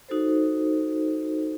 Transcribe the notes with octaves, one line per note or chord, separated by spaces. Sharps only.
D#4 F#4 A4 C5